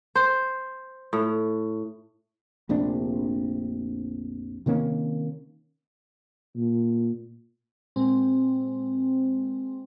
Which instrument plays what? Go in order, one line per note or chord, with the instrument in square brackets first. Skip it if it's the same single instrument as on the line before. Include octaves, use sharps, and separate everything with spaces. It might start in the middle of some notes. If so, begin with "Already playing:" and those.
[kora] C5
A2
[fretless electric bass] F1 A#1 C3 D4
C3 D#3 A#3 C#4
[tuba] A#2
[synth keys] A#2 G#3 C4